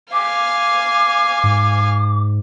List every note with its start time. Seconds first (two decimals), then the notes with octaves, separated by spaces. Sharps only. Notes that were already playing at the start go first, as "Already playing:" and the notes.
0.13 F5 G#5 D6
1.44 G#2